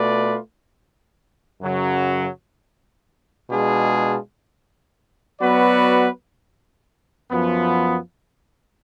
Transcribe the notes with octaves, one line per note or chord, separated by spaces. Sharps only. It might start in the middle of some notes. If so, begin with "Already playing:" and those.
Already playing: B2 A3 F4 B4 D5
F#2 C#3 F#3
B2 G#3 D4 F4 G#4
F#3 B3 F#4 B4 D5
F#2 F3 B3